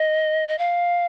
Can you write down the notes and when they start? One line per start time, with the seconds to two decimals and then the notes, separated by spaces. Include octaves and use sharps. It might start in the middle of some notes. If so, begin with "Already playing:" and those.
Already playing: D#5
0.48 D#5
0.58 F5